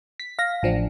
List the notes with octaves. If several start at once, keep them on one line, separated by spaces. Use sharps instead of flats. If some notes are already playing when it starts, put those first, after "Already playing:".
B6
F5 A#6
A1 F3 D4